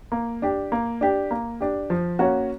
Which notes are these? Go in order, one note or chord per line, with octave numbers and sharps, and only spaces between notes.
A#3
D4 G4
A#3
D4 G4
A#3
D4 G4
F3
A#3 C#4 F#4